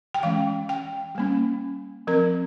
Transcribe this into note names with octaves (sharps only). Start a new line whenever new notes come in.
G5
E3 G#3 C#4 F5
G5
G3 A#3 C#4
F3 C4 A#4